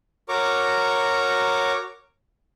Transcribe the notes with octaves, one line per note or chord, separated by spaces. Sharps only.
F#4 A#4 C#5 A#5 C#6 D6